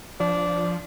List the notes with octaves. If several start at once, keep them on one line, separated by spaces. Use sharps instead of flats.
F3 D4